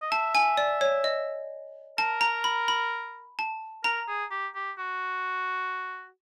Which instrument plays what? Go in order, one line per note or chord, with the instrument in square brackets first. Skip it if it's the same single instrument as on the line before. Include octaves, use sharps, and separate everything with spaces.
[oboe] D#5
[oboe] E5 [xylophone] A5
[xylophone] G#5
D5
C#5
D#5
[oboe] A#4 [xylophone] A5
[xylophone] A#5
B5
B5
A5
[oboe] A#4 [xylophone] A#5
[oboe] G#4
G4
G4
F#4